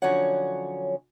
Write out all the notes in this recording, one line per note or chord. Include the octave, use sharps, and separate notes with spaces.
D3 F3 F#3 C#4 C#5 F#5